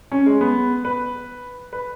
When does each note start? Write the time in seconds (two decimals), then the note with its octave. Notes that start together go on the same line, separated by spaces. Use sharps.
0.11 C#4
0.26 G#3
0.41 B3
0.85 B4
1.73 B4